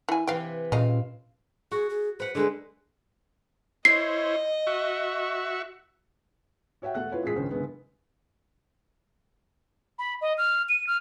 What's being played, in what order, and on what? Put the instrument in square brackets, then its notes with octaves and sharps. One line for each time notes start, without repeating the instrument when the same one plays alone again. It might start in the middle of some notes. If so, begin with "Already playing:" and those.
[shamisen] E3 G#5
[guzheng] C3 E3 B4 [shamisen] F5 G5
[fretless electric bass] A#2 C#4 [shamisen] C#3 D#5 [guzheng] C4 F5
[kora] F#4 [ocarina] G#4
[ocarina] G#4
[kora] B4 F#5 [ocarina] C5
[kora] D3 G#3 B4 [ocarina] A4
[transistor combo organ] E4 C5 C#5 [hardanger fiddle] D#5 [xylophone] C7
[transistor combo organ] F#4 E5 C#6
[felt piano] F#4 C#5 E5 F#5 G5
E1 A3 A4 F#5 F#6
E4 F4 B4 C#5
A1 A#2 G#3 G#4 B6
C#2 G2 D#3 C#4 C5
F#1 D3 G#3 B3
[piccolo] B5
D#5
F6
D#7
F6